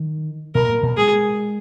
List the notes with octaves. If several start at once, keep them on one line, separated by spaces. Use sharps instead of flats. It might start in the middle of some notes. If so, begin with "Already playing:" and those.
Already playing: D#3
B2 A#4
A#2
B2
G#3 G#4